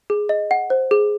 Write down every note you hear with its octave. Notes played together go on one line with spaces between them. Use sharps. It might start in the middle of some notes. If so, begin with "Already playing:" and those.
G#4
D#5
F#5
C5
G#4